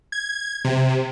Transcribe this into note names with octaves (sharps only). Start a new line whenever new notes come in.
G#6
C3